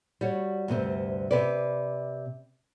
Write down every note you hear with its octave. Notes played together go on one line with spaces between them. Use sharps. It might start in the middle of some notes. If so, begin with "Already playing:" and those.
G3 F#4 C#5
D2 G2 C3 C4
C3 B4 D5